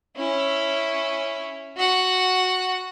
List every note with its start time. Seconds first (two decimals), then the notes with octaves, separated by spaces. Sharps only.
0.16 C#4 E4
1.77 F#4 F#5